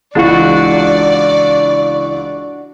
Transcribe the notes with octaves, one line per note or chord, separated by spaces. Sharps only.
C#2 E3 G#3 D4 F#4 D5